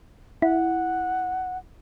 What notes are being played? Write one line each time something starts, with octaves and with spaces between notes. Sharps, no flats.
E4 F#5